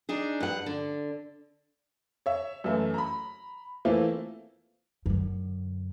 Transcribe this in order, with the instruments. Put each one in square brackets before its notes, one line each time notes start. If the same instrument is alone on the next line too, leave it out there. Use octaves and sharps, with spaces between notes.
[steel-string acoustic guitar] D4 D#4 G#4
G2 F#5
D3
[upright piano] C#5 E5
F#2 E3 A3 E4
A#5 B5
E3 A3 A#3 C4 E4 F4
[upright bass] F#2 D3